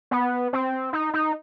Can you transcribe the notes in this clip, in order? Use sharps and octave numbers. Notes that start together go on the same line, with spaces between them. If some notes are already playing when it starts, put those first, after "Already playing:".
B3
C4
D#4
D#4